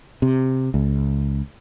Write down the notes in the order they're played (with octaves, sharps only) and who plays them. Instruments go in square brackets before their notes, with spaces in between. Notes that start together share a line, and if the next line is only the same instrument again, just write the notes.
[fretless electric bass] C3
C#2